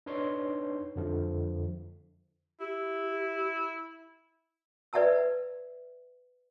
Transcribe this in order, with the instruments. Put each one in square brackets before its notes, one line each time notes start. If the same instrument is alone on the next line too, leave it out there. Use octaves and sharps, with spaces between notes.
[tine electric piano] D4 D#4 B4 C#5 C6
F2 D3 F3
[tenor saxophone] E4 [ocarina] G4
[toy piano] B4 D5 E5 F#5 A5 E6